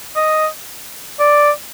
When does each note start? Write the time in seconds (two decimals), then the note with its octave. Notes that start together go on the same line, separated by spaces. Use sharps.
0.16 D#5
1.20 D5